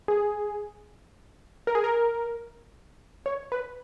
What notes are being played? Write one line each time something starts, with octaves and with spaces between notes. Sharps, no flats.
G#4
A#4
G#4
A#4
C#5
B4